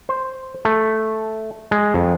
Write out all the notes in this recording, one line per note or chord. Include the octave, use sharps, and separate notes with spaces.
C5
A3
G#3
F2